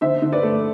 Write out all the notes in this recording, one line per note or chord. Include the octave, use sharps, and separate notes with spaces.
D3 C5 E5
D3
B4 D5
A3